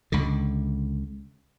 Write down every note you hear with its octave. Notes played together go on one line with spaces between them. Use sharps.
C#2 D3